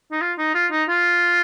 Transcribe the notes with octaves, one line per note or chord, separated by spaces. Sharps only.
D#4
F4
D#4
F4
D#4
F4